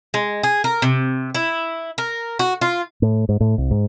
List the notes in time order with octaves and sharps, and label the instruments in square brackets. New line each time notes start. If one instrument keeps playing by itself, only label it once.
[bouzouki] G#3
G#4
A#4
C3
E4
A#4
F#4
F4
[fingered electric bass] A2
G#2
A2
C2
G#2